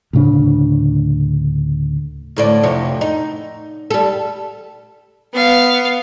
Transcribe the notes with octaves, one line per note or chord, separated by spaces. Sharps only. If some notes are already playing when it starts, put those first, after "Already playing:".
D2 A2 C#3 D4
D2 A2 D5
F2 C3 C#5
D#4
G3 A4
B3 F5